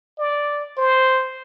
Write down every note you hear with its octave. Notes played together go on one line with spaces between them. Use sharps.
D5
C5